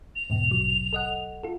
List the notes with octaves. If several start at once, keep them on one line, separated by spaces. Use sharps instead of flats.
F7
E2 G#2 B2
A#1 F#3
A4 D#5 F#5
F4 A4